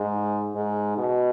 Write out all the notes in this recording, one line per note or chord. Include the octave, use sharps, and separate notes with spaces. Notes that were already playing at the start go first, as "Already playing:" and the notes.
Already playing: G#2
G#2
B2